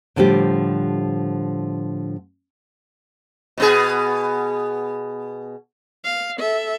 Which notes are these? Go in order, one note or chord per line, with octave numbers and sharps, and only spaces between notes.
A2 D3 F3 G3 G4
B2 B3 G#4
F5
A4 E5